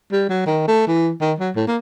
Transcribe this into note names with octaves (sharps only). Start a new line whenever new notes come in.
G3
F#3
D#3
A3
E3
D#3
F#3
A2
A#3